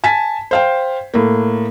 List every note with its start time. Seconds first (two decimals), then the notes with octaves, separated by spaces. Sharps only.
0.04 G#5 A5 B6
0.51 C5 F5 G5
1.14 A2 A#3